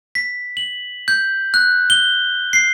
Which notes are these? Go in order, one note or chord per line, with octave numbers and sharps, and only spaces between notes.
B6
F#7
G6
F#6
G7
C7